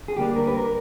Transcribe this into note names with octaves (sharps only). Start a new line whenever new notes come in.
G#4
D3 G3 A#3 D4 G4
A#4
B4
A#4